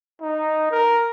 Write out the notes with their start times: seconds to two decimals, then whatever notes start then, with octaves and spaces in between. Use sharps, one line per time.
0.21 D#4
0.72 A#4